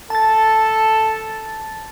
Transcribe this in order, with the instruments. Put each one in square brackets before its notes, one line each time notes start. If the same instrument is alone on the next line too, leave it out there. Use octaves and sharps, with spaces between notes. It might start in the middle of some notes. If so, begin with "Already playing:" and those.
[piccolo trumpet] A4 [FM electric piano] A5 A6